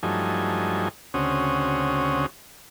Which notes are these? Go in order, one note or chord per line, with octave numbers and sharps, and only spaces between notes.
G2 F3 F#3 A3 D#4 G#5
D2 C#3 C4 C#4 F#4 D#6